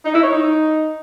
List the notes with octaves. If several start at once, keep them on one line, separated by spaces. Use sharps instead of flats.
D#4
E4
C#5
D#4